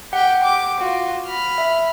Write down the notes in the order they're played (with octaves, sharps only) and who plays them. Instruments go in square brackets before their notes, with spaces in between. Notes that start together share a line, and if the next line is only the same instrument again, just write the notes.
[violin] G4 G5 [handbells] F#5
[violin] D6
F4 F#4
B5 F6
[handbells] E5